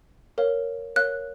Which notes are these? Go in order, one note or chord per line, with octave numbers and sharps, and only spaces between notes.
A#4 C#5 F5
A#4 C#5 F5 F#6